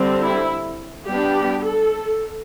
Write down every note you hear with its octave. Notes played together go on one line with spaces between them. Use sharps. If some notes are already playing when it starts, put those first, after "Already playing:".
Already playing: D3 G3 C4
E4
G3 B3 D4 G4
A4